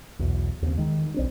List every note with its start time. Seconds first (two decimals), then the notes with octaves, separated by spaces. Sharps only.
0.19 B1 E2 B2
0.62 D#2 C#3 C4
0.77 D#3 G#3
1.14 B1 C4 D4